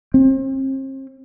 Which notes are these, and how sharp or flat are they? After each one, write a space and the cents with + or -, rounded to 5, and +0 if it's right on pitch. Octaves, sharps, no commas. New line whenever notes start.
C4 +40